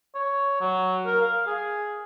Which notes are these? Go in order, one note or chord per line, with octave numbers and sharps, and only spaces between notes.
C#5
F#3
A#4
F5
G#4